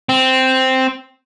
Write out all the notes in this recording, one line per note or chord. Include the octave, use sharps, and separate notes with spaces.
C4